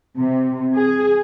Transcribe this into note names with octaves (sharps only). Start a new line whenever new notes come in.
C3
G#4